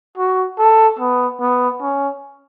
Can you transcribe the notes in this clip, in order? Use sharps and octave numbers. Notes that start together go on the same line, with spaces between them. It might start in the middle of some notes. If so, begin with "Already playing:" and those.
F#4
A4
B3
B3
C#4